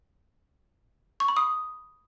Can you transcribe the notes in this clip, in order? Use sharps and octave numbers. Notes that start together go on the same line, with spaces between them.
C#6
B5
D#6